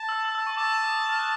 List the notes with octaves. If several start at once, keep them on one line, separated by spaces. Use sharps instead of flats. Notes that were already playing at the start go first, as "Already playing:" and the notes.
Already playing: A5
E6
E6
E6
C#6
A5 D6
E6
D#6
E6
F6
F#6